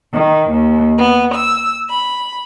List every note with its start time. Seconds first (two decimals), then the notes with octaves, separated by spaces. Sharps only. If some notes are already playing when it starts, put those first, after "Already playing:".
0.12 D#3
0.49 D#2
0.98 B3
1.34 E6
1.89 B5